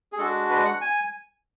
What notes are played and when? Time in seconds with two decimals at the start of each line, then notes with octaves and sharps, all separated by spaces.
0.13 G#4
0.18 G#3 D4 F#4 A4
0.50 B4
0.65 F#5
0.81 G#5